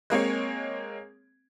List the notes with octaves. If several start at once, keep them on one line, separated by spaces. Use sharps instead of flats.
G#3 A#3 C4 C#5